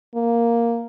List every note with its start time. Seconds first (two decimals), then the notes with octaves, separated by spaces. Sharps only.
0.15 A#3